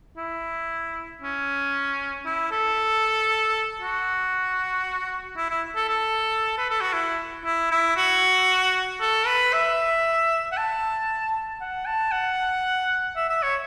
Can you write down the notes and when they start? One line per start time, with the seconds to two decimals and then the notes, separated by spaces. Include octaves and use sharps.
0.17 E4
1.21 C#4
2.25 E4
2.51 A4
3.81 F#4
5.36 E4
5.50 E4
5.76 A4
5.89 A4
6.58 B4
6.70 A4
6.81 F#4
6.93 E4
7.45 E4
7.71 E4
7.96 F#4
9.00 A4
9.26 B4
9.53 E5
10.52 F#5
10.57 A5
11.61 F#5
11.86 A5
12.12 F#5
13.16 E5
13.29 E5
13.43 C#5